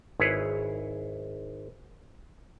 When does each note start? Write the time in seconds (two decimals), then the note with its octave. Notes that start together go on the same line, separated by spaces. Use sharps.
0.20 G#1 E4 G#4 B4 C#5